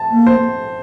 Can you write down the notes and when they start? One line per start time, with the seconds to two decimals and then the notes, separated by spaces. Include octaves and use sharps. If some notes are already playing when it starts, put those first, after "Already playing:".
Already playing: A5
0.11 A#3
0.27 C5